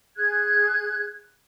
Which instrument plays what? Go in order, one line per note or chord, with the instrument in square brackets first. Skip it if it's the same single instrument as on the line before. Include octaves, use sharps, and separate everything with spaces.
[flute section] G#4 F#6 G#6